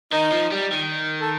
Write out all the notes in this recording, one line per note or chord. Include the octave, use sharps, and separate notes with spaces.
D#3 D#4
F3
G3
D#3
A4